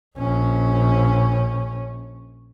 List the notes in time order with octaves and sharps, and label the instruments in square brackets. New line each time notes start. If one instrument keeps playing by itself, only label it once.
[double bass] A#1 C#4